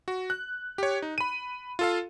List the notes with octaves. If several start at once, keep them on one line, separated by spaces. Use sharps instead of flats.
F#4
F#6
G4 C#5
D#4
B5 D#7
F4 A4 F5